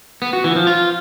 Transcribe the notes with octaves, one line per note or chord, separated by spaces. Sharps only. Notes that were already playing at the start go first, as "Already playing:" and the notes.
B3
F#4
E3
F3
F4